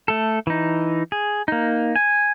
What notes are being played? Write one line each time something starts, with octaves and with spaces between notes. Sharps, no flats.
A3 A4
E3 D#4
G#4
A#3 D#4
G#5